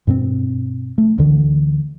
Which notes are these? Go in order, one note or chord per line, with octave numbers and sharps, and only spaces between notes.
G2 B2 B3 C4
A3
D2 D3 E3